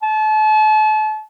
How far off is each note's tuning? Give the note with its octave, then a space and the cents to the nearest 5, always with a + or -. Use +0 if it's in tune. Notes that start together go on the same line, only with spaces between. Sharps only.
A5 -35